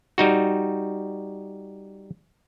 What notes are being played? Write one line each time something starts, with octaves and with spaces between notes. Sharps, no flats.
G3 D#4 F#4